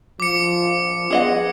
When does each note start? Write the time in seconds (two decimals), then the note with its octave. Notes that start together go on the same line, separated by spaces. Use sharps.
0.20 F3 D6 C#7
1.10 B3 G#4 D#5 F#5